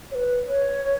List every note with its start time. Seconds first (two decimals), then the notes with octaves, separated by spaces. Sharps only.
0.11 C#5
0.15 B4
0.48 C#5